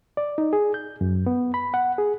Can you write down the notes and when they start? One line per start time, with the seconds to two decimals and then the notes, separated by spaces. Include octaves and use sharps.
0.17 D5
0.38 D#4
0.53 G#4
0.74 G6
1.01 F#2
1.26 B3
1.54 B5
1.74 F#5
1.98 G#4